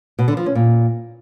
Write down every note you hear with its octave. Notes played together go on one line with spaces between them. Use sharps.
B2
D3
F3
C#4
A#2